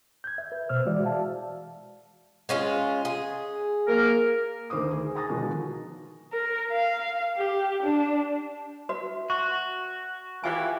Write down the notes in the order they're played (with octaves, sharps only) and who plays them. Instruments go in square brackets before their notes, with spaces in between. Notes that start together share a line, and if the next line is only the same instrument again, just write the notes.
[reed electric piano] G6 G#6
E5
B4
B2 C5 E6 F6
E3 G#3 F#4 D5 E5
F5 A5
[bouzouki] G#3 C#4 F4
G#4
[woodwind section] A#3 A#4
[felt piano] D2 D#3 C5 D6 D#6
G#4
G#5 A#5 D#6 A6 A#6
B2 D3 D#3 F3 G#3 D4
[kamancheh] A#4
F5
G4
D4
[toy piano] F#4 B4 [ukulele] E5
[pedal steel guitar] F#4 [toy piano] C#6
[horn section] E3 [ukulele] F4 G4 G#4 [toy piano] B4 E5 G#5